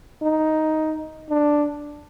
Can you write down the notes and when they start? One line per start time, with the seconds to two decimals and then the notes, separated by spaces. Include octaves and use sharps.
0.22 D#4
1.30 D4